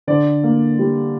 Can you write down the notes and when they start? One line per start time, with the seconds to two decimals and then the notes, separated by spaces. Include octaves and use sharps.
0.07 D3 D5
0.44 A#3
0.79 G3